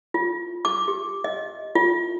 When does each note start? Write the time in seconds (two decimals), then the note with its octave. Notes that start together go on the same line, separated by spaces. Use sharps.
0.14 F4
0.65 D6
0.88 G4
1.24 D#5
1.75 F4